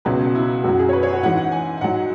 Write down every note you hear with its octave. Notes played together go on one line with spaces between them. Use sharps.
C#2 B2 F#3 B4
E4
F#2 F#3 F#4
G#4
C#5
B4
C#5
F#4
G#2 E3 F#5
F#5
G#5
G#5
G#2 F#3 F#5